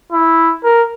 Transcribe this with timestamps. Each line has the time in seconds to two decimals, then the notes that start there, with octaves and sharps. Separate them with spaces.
0.12 E4
0.64 A#4